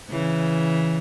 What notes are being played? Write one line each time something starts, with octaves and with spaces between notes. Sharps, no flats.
C#3 E3